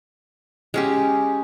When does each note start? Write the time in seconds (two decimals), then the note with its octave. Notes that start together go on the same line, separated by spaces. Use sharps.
0.74 G#3 C#4 G4